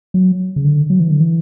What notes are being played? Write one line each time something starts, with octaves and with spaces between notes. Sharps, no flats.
F#3
C#3
D3
F#3
E3
D3
E3